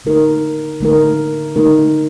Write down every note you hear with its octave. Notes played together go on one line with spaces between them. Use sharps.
D3 A3 D#4 A#4
D3 A3 D#4 A#4
D3 A3 D#4 A#4